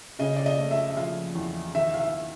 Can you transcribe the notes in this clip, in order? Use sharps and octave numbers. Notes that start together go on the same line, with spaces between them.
C#3 D#5
D5
D#5
A3
E5
E5
F3 F5
E2
D#3 E5
F5
E5